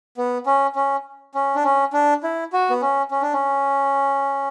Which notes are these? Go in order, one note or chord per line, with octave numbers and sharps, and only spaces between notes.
B3
C#4
C#4
C#4
D4
C#4
D4
E4
F#4
B3
C#4
C#4
D4
C#4